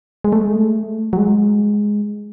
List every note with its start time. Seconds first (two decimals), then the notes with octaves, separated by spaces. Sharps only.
0.24 G#3
0.32 A3
0.41 G#3
0.55 A3
1.13 F#3
1.18 G#3